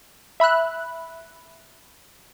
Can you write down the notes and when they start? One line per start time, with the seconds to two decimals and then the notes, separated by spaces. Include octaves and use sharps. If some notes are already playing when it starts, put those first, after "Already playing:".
0.40 E5 B5 E6 F#6